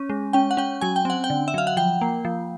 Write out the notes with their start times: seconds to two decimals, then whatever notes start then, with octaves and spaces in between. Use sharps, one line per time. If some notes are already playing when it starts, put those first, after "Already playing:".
Already playing: C#4
0.10 G#3
0.33 C#4 G5
0.51 F#5
0.57 C#4 G5
0.81 F#3 G#5
0.96 G5
1.05 C4 F#5
1.24 G5
1.30 D3
1.48 E5
1.54 F#3 F5
1.67 F#5
1.77 F3 G5
2.01 A#3
2.25 F3